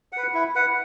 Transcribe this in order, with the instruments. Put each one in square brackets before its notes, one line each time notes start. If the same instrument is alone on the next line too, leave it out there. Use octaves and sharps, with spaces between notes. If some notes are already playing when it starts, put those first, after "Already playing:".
[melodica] B4 F#5
E4
B4 F#5